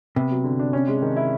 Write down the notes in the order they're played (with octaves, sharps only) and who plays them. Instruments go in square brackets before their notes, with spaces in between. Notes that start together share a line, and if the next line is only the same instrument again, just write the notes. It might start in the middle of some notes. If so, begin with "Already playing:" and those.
[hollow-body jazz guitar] C3 [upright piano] B3
[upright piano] F#3
D3
D4
C#4
G#3
D#3
E4